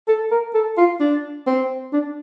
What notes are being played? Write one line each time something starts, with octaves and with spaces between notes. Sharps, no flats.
A4
A#4
A4
F4
D4
C4
D4